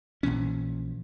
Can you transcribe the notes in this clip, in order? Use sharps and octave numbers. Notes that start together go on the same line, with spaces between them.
A#1 A#2 E3 C#4